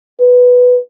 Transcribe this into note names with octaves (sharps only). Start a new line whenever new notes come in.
B4